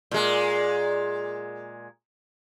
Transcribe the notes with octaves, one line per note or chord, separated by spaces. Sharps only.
A#2 G#3